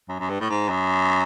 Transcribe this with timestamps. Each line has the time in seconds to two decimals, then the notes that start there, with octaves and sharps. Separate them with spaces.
0.09 F#2
0.20 F#2
0.29 G2
0.40 A2
0.49 G#2
0.69 F#2